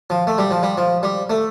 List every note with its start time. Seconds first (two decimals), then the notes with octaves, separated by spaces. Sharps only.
0.10 F3
0.27 A3
0.38 G3
0.51 F3
0.63 G3
0.77 F3
1.03 G3
1.30 A3